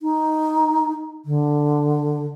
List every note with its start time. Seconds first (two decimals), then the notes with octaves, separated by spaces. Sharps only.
0.02 D#4
1.25 D3